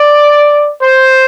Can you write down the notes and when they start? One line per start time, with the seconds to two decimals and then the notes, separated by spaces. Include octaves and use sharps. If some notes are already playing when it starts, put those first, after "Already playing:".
Already playing: D5
0.81 C5